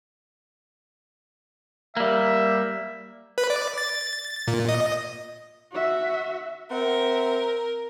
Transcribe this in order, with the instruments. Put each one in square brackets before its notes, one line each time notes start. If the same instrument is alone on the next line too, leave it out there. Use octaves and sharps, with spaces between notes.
[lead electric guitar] G3 A#3 [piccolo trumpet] E5
[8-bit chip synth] B4
D5
A6
A#2
D#5
[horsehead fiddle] F#4 E5
[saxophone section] C4 E5 F#5 [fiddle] A#4